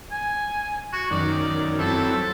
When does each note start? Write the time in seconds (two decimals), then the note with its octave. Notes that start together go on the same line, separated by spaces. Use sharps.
0.11 G#5
0.92 F#4
1.11 F#2 D#3 D5
1.79 F#3 C4 E4 A4